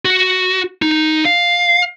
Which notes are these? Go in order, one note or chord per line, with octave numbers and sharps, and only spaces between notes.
F#4
D#4
F5